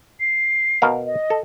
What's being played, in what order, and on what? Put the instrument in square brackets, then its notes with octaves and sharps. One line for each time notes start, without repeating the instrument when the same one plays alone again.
[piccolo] C7
[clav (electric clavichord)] B2 A#4 F5
[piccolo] D#5
[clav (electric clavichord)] A4